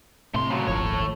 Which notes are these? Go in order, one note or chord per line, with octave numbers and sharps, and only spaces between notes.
A2 C3 A3 C6
C#3 F#3
D#1 G#1 F3 A3 C#5